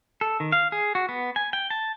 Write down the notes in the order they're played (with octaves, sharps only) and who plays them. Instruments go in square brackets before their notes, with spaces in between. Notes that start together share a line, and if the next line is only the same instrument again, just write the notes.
[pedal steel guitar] A4
D#3
F5
G#4
F#4
B3
G#5
G5
A5